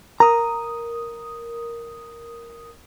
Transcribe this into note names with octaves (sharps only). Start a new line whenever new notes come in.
A#4 A#5 D#6